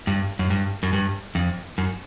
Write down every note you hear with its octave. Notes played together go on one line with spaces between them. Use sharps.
G2
F#2
G2
F#2
G2
F2
F#2